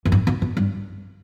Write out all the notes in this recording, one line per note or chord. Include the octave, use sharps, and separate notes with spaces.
F#2
G2
B2
B2
G2